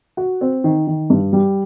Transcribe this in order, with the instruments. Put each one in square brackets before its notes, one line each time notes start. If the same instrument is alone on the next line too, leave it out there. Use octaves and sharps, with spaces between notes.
[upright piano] F#4
C4
D#3
D#3
G2
G3